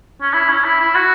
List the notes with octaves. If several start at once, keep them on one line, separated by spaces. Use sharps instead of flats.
C#4
E4
C#4
E4
E4
F#4